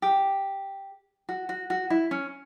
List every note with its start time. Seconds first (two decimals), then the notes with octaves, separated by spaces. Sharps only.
0.02 G4
1.29 F#4
1.49 F#4
1.70 F#4
1.90 E4
2.11 C#4